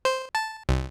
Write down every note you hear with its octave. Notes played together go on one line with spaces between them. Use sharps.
C5
A5
C2